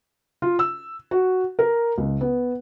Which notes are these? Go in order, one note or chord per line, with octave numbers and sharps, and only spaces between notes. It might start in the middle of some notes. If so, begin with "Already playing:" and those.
F4
E6
F#4
A#4
C#2
B3